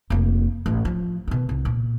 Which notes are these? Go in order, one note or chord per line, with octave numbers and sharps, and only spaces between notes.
F1 A#3
A1
F3
B2 D#3
C2
A#2